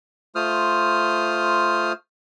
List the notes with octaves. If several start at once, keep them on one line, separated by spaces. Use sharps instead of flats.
A3 F4 C5 D#6 F6